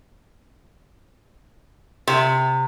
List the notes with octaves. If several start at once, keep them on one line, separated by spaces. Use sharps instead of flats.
C3